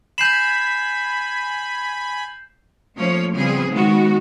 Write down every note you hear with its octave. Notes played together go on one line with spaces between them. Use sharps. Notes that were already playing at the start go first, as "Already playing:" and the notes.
G#5 B5 G6 C7 E7
F3 A3 A#3 C#4 C#5
C#3 F3 G3 B3 C4 G#4
D#3 G#3 B3 C#4 F#4